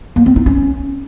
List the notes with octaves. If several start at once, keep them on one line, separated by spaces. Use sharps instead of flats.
A#3
C4
D#4
C#4